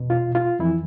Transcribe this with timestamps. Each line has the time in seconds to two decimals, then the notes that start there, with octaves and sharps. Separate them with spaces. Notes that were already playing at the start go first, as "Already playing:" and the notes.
Already playing: E2 B2
0.10 F4
0.35 F4
0.59 F2 E3 E4